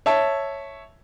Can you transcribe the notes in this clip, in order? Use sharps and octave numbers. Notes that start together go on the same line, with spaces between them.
C#5 E5 A5